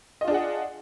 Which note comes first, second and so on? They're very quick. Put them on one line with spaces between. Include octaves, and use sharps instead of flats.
D#5 F4 D4 G#4 F#5